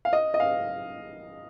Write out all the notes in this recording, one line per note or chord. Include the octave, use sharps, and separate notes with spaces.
F5
D#5
D#5
F5